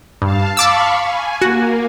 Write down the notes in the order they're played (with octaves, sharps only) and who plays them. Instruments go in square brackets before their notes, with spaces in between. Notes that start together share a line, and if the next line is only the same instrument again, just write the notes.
[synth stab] G2 [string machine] F5 A5
[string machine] F5 B5 C#6 [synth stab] A5 D6 E6
[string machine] G#5
[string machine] A#3 [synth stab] F#4